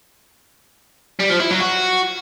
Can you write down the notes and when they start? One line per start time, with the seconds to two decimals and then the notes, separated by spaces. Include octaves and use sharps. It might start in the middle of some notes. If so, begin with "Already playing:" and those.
1.20 G3
1.30 F3
1.40 E4
1.51 F#3
1.61 F#4